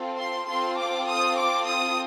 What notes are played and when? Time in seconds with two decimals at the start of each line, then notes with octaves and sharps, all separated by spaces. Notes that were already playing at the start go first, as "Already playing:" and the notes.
Already playing: C4 F4 A4
0.17 C6
0.47 C4 F4 A4 C6
0.78 D6
1.08 D#6
1.38 D6
1.68 D#6